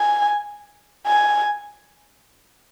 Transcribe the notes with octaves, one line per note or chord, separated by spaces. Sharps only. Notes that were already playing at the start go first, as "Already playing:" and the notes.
Already playing: G#5
G#5